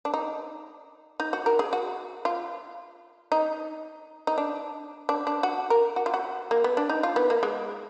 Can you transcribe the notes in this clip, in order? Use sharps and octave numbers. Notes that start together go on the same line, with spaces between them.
D4
D#4
D#4
F#4
A#4
G#4
F#4
F4
D#4
D#4
D4
D4
D4
F#4
A#4
F#4
F4
F#4
A#3
B3
D4
D#4
F4
B3
A#3
G#3